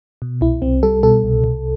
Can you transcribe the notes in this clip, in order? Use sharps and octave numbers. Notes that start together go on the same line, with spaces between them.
B2
C2 E4
C2 C4
G3 A4
B2 A4
C2
C2